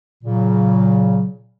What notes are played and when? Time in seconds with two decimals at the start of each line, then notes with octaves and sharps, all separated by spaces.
0.24 A#2 C#3 F#3